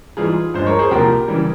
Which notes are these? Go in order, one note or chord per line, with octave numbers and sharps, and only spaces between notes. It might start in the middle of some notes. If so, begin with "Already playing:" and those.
G#2 E3 G3 F4 G#4
G2 F3 G#3 C5
A#4 C#5
G#4 C5
C2 A#2 F3 G4 A#4
C#3 E3 G3